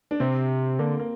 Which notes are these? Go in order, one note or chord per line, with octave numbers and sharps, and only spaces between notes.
D4
C3 C4
D3 A#3
A#3